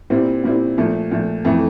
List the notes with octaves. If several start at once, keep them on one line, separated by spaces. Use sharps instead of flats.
A#2 G3 C4 E4
A#2 G3 C4 E4
A#2 F3 A3
A#2 F3 A3
F2 E3 A3